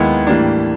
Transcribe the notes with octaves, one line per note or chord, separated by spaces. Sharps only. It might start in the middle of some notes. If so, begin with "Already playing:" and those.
Already playing: D#2 D#3 G#3 B3 E4
A2 E3 G3 A#3 D4